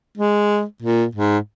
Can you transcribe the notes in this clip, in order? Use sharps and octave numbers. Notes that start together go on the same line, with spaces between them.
G#3
A#2
G#2